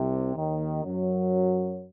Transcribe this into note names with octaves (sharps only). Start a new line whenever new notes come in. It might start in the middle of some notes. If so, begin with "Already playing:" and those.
Already playing: C2 C3
D#2 D#3
F#2 F#3